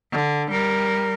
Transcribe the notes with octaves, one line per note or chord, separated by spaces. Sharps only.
D3
G3 A#4